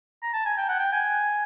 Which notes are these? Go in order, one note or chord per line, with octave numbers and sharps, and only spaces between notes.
A#5
A5
G#5
G5
F#5
G5
G#5